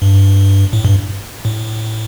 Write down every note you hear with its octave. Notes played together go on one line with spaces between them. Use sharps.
G2
A2
G2
A2